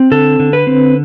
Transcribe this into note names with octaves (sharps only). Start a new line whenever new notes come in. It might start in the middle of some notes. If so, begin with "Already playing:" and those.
Already playing: C4
D3 A4
D3
B4
C4